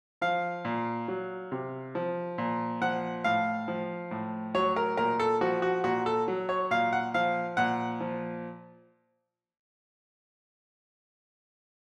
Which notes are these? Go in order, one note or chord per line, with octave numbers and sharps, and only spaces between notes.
F3 F5
A#2
F#3
C3
F3
A#2
F3 F#5
A2 F5
F3
A2
F#3 C#5
A#4
A#2 A#4
A4
F3 F#4
F#4
A#2 F#4
A4
F#3
C#5
A#2 F5
F#5
F3 F5
A#2 F#5
F3